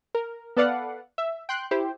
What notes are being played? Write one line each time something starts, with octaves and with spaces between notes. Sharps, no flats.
A#4
B3 A4 B4 D5 F5 F#5
E5
G5 C6 F#6 G6
E4 G4 C5